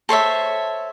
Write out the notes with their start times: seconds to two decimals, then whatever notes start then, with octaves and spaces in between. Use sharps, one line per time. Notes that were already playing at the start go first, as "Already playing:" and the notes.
0.09 A4 C5 C#5 E5